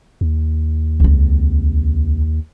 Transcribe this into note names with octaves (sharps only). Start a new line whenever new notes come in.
D#2
C#2 C4